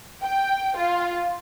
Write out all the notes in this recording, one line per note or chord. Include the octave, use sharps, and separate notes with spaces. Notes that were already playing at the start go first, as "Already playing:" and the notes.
G5
F4